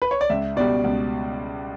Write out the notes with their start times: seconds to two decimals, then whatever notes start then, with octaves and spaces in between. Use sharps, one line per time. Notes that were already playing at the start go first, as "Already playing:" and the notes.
0.02 B4
0.11 C#5
0.21 D5
0.30 C#2 E5
0.56 B2 G3 D5
0.84 C#2